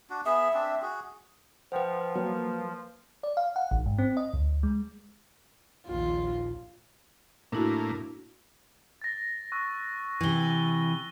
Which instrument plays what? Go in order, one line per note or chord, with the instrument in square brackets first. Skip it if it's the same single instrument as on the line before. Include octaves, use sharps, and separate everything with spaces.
[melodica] D4 F#4
[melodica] B3 G#4 [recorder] E5
[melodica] C4 D4
F#4 G#4
[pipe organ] F3 [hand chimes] B4 C5 [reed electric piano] F#5 G5
[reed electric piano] F#3 [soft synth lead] A#3 [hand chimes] B4
[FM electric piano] D5
F5
F#5
A1
G#2
C4
D#5
D2
G#3
[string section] A#1 D#2 [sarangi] F4
[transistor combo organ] A2 A#3 [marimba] D4 E4 F#4
[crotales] A6 A#6
C#6 E6 F#6
[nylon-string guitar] C3 E3 [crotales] D#7 G7